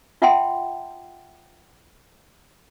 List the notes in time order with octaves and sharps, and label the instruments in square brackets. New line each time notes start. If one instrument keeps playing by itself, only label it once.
[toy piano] F4 E5 F#5 G5 A5 C6